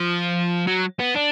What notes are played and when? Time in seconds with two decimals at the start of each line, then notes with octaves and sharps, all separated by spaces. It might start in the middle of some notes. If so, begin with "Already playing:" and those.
Already playing: F3
0.67 F#3
1.00 B3
1.17 D4